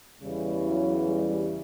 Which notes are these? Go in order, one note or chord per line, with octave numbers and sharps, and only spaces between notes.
E2 C#3 E3 G3
F#3
G3